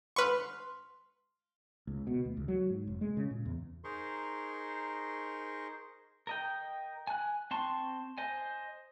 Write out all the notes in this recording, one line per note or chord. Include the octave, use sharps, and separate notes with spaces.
B4 C6 C#6 F6
C#2
B2
D2
C#2
F#3
G#2
F1
G#3
C#3
A#2
E2
D#4 G#4 A#4 C5 C6 C#6
A#4 D#5 G5
G#5 F#6
C4 A5 C6 C#6
C5 D#5 G#5